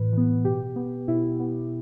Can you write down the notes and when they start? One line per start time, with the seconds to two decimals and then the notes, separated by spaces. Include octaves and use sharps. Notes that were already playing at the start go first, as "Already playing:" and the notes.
Already playing: A2 E3 B4
0.12 E3 B3
0.45 B2 G4
0.76 B3
1.08 B2 E4
1.40 B3